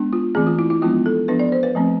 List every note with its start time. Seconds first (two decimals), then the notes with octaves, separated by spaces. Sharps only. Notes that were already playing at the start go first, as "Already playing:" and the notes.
Already playing: G#3 B3 D4
0.13 F4
0.35 E3 A3 C4 G#4
0.47 F4
0.59 E4
0.70 E4
0.82 F3 G#3 B3 D4 F4
1.06 A4
1.28 F3 B3 D4 B4
1.39 D5
1.52 C5
1.63 B4
1.75 F3 A3 C4